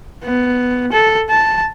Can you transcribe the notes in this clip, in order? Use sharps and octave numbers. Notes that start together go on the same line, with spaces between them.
B3
A4
A5